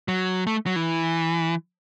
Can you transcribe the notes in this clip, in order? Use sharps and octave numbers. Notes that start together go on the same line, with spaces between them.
F#3
A3
F#3
E3